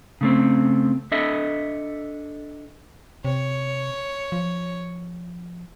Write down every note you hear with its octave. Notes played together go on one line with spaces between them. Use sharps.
C#3 A3 C4
D4 A4 D#5 E5
C3 C#5
F3